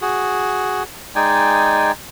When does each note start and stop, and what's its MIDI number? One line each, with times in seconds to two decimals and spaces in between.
0.02 0.83 66
0.02 0.83 68
1.16 1.92 56
1.16 1.92 63
1.16 1.92 74
1.16 1.92 79
1.16 1.92 80